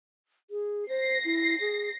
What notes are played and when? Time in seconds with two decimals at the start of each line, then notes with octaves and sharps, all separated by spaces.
0.50 G#4
0.89 C5 A#6 C7
1.25 E4
1.61 G#4